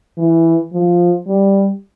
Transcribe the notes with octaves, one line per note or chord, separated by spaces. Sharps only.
E3
F3
G3